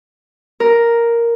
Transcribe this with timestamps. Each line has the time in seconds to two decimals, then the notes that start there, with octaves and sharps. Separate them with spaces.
0.60 A#4